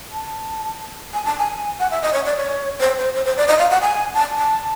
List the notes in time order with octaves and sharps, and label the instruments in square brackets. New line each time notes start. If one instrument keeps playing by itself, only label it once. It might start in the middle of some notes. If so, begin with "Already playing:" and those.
[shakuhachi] A5
G#5
A5
G#5
F#5
E5
D#5
C#5
D5
C#5
C5
C5
C5
C5
D5
D#5
F5
F#5
G#5
A5
A5